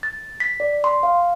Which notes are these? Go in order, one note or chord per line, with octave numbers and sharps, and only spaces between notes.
A6
B6
D5
C6
F5